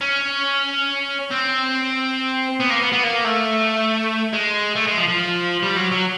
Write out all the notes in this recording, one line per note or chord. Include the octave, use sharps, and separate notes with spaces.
C#4
C4
B3
A#3
B3
B3
A#3
A3
G#3
A3
G#3
F3
F3
G3
F#3
F#3